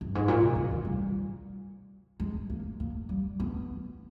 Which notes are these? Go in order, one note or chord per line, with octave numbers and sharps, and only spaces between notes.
G2
G#2
A#2
B2
C#3
D#3
G3
G#3
A#3
A#3
G3
B3